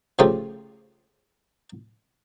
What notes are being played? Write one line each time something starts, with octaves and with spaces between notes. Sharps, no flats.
C#3 F3 A3 F4 G4 A4